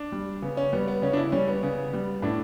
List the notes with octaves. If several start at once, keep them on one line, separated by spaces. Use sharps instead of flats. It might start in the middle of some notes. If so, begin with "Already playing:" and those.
Already playing: D4
G3
C#3 B3
C#4
G3 B3
B3
C#3 C#4
D4
E4
G3 C#4
B3
C#3 B3
G3
A2 D4